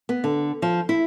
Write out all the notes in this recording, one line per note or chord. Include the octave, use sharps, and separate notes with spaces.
B3
D3
F3
E4